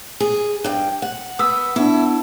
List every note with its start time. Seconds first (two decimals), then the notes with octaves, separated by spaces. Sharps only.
0.20 G#4
0.64 G2 G5
1.02 F#5
1.39 B3 D#6 E6 B6
1.76 B3 D4 E4